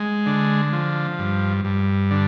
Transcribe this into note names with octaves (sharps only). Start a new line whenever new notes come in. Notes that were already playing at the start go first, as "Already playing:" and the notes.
Already playing: G#3
D3
F3
G2
G2
D3